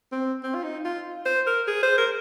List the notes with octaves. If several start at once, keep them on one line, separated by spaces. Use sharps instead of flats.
C4
C4
F4
D#4
F4
C5
A#4
G#4
C5
A#4